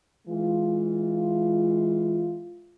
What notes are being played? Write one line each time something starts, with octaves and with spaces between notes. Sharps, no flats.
E3 G#3 F4